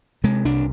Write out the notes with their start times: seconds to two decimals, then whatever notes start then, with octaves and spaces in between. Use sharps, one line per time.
0.24 C3 G#3
0.45 C2 D4